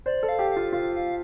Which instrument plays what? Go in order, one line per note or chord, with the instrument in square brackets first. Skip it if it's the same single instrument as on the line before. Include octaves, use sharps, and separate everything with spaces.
[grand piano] C5 [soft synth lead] D5
[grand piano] A4
[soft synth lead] F5
[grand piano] G4
[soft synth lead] F5
[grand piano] F4
[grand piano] F4 [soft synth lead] F5
[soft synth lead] F5